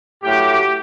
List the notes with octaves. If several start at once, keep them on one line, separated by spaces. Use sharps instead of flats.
A2 F#3 A3 G4